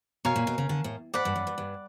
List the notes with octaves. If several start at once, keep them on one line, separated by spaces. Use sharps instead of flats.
B2 A#4 C#5 F5 G#5
A#2
B2
C#3
D3
A2
G#2 D5 F#5 B5
G2
F#2
G2
G2